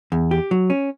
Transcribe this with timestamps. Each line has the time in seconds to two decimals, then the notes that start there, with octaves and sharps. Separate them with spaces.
0.12 E2
0.31 G4
0.51 F#3
0.70 C#4